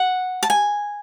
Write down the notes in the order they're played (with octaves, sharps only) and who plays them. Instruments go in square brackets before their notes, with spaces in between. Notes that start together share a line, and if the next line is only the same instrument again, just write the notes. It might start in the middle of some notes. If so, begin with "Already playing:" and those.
Already playing: [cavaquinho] F#5
A5
G#5